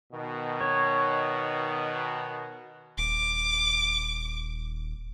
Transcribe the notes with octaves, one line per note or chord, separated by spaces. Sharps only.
B2 D#3
C#5
D#1 D6